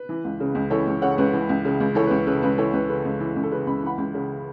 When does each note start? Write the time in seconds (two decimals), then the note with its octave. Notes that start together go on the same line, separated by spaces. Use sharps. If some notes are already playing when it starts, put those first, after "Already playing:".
Already playing: B4
0.09 E3
0.24 C#2
0.40 C#3
0.55 C#2
0.70 E3 A4 C#5
0.87 C#2
1.02 C#3 C#5 F#5
1.18 C#2 B4
1.34 E3
1.49 C#2
1.65 C#3
1.80 C#2
1.95 E3 A4 C#5
2.06 C#2 B4
2.27 C#3 B4
2.42 C#2 B4
2.58 E3 A4 C#5
2.73 C#2 B4
2.89 C#3 B4
3.05 C#2
3.20 E3
3.36 C#2
3.43 A4
3.52 C#3 B4
3.67 C#2 B5
3.83 E3 F#5 B5
3.98 C#2
4.14 C#3